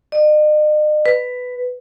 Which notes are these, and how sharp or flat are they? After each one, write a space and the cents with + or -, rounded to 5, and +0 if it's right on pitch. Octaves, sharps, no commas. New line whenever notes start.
D#5 -45
B4 +10